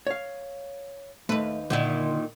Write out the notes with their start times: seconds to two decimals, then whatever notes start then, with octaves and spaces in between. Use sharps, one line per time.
0.07 C#5 F5
1.29 D#2 A3 B4
1.70 A#2 D3 D#3 E4